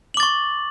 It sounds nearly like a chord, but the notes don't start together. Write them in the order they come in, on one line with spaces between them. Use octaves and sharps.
F#7 D6 A6 C#6